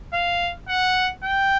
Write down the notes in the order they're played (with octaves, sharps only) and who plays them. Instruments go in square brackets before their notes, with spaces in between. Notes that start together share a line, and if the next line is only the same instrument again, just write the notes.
[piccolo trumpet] F5
F#5
G5